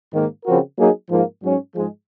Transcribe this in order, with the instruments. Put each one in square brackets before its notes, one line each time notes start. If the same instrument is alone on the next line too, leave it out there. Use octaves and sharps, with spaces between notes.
[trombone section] G#2 D#3 A#3
C#3 F3 C4 F#4 A#4
F#3 A#3 D#4 G#4
G#2 F3 A#3
G#2 F#3 C#4
G#2 F3 G#3